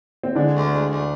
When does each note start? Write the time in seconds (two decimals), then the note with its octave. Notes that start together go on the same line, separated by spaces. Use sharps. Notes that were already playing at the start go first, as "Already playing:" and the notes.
0.23 C4
0.35 D3 G#3 D4
0.54 D2
0.72 G#3
0.90 D2